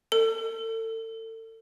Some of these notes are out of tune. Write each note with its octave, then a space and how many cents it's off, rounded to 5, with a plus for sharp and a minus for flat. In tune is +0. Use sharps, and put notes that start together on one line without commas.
A4 +35